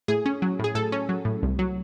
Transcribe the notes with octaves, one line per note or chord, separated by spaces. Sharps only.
A2 G#4
C#4
F#3
A2 G#4
A2 A4
C#4
F#3
A2
C2
F#3